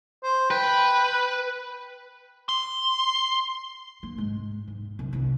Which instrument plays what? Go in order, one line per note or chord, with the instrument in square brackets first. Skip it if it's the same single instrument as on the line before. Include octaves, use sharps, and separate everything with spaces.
[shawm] C5
[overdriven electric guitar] B4 [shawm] G5
[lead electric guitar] C6
[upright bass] A#3
G#2 G#3
G#2
C2 A#2
C2 E4